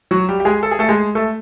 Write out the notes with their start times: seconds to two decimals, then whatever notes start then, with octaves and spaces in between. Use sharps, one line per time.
0.11 F#3 F#4
0.29 G3 G4
0.40 G4
0.45 G#3 G#4
0.63 A4
0.71 G#4
0.79 A3 A4
0.89 G#3 G#4
1.15 A3 A4